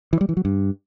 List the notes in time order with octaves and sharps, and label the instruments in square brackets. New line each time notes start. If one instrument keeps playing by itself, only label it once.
[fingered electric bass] E3
G3
E3
F#3
G2